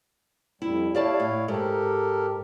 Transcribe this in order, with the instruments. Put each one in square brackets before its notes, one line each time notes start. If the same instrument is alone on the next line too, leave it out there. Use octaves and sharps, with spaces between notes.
[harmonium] F2 G3 [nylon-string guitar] E4
[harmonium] E4 C#5 F5 [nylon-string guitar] G4 D5 A5
[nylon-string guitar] A2
[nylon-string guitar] G#2 [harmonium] G4 A4 A#4